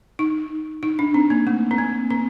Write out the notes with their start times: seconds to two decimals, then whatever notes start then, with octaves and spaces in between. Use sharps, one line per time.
0.19 D#4
0.83 D#4
0.99 D4
1.14 C4
1.30 A#3
1.47 A3
1.71 C4
1.78 A#3
2.10 C4